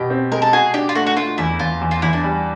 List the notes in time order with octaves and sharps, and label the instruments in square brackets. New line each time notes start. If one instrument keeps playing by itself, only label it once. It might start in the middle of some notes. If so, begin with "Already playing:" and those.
Already playing: [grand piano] B2 [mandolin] G4
[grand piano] C4
[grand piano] G#3 [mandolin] A#4
[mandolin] A4
[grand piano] F#4 [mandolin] G#4
[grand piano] D4 [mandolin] G4
[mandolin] F4
[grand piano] A3 [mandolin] F#4
[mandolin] F#4
[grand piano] A3 [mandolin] F4
[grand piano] E2 [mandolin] E4
[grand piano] E2 [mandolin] F4
[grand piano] E2
[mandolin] F4
[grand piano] E2 [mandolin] E4
[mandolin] D4
[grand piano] G3